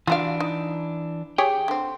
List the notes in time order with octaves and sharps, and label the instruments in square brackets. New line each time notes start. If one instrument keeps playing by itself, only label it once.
[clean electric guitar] E3 D4 [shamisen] F4 F#4 F5
[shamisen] D#4
[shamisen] G4 G#4 C#5 [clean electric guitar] G5
[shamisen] D3 C4